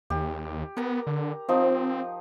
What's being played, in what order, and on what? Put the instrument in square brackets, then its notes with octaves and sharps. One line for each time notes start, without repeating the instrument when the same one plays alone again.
[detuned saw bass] D#2 [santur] G4
[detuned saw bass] B3 [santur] A#4 A#5
[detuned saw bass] D3
[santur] F3 D#4 [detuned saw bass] C4